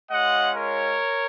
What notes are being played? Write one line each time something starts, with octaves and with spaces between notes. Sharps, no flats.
G#3 C#4 F4 D#5 F#5
A#4 C#5